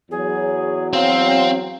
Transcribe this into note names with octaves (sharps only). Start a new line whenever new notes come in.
E2 F#3 G#4
C4 F5